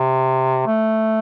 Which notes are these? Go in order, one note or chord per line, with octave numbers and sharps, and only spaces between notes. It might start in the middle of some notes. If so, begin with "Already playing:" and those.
Already playing: C3
A3